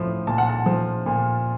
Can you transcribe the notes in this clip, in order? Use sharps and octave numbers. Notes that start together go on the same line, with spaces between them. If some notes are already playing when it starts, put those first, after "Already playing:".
Already playing: A2 F3
A#2 A5
F#5
A5
F3
A#2